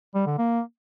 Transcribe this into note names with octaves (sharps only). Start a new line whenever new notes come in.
G3
D3
A#3